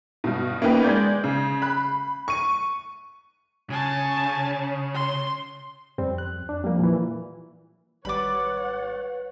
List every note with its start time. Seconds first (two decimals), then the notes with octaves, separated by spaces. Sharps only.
0.24 G2 B2
0.62 A#3 B3 C#4 D#4 B4 G5
0.83 G#3 D5 G6 G#6
1.24 C#3
1.62 B5 F#6
2.28 C#6 D#7
3.70 C#3 G#5 A5
4.94 C6
5.98 F2 G3 C4
6.18 F#6
6.49 D4
6.64 F3 G3 A#3
6.79 A#2 E3
8.05 G#1 G3 B4 C#5 F#5 B5 D6 A6